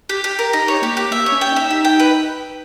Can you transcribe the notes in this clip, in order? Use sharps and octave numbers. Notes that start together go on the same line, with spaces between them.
G4
G4
A#4
D#4 G4
C#5
A#3 G4
G4
A#3 E5
C#5
C#4
G5
D#4 E5
D#4 G4
G5
B4